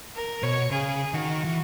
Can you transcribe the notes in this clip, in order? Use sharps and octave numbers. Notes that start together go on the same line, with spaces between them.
A#4
B2 C#5
C#3 G#4
D#3 F#4
E3